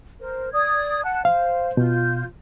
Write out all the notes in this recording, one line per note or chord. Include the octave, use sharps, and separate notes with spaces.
A#4 C5
D5 D#6 G#6
F#5 A5 F#6
C5 F5
B2 F4 G6